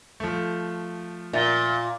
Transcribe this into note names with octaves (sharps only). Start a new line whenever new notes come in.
F3 A3
A#2 E5 A6 G7